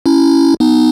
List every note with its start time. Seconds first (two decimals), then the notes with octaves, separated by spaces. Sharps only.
0.06 C#4 E4
0.60 B3 D#4